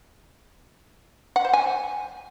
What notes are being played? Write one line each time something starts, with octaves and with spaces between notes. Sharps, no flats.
F#5
C5
G#5